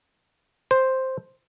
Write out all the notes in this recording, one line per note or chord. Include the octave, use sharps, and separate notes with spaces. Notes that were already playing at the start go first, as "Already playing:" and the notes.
C5